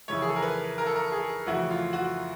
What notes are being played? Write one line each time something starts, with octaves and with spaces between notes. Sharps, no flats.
F2 C#3 E3 C#5
G#4
A4
A#4
B4
A#4
A4
A#4
G#4
F2 C#3 E3 A3 F#4
F4
F#4